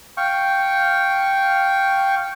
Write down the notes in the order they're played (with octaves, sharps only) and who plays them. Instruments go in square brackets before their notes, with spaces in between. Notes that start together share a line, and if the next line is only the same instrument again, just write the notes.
[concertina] F5 G5 C#6